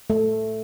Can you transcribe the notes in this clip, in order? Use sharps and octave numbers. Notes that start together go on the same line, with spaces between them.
A3